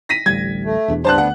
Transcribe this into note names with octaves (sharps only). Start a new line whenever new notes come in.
A#6 B6 D#7
A1 D2 G3 G#6
A3
E1 E2 D4
C#2 G2 B3 D4 C5 A5 F#6
D2 F#5